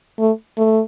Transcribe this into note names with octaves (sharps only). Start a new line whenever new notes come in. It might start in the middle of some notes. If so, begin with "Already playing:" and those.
A3
A3